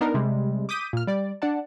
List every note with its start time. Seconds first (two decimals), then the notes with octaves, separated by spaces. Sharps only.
0.01 B3 D4 D#4 A#4
0.14 C3 G3 G#3
0.69 D6 D#6 G6 B6 D#7
0.93 A#2 F6
1.07 G3 D5
1.42 D4 D5 F#5 A5